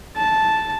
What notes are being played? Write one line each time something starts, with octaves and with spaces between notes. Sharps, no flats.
A5